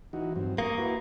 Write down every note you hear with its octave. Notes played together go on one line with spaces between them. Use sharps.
E3 D#4 F#4
G2 F#3 C4
A#3 C#6 D#6
E4 F#4 B4